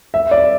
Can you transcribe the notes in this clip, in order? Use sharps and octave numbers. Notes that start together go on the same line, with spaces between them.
E5
D5